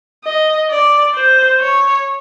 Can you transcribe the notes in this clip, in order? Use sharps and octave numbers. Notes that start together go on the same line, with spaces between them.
D#5
D5
C5
C#5